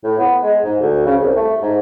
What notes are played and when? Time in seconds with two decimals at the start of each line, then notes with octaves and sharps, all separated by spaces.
0.04 A2
0.19 B3
0.43 G#3
0.64 G#2
0.81 D2
1.06 C#3
1.21 C2
1.37 A3
1.62 G#2